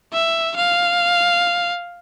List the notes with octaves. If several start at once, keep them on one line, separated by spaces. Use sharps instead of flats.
E5
F5